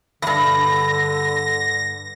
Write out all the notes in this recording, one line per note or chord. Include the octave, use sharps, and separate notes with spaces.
E2 G2 D3 A#6